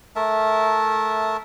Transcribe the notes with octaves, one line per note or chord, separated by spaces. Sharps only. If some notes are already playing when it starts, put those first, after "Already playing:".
A3 A#4 E5 A5